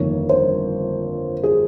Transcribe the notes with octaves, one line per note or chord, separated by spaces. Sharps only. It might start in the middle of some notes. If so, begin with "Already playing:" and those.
Already playing: G1 F2 D#3 A#3 C#5
C5
G#4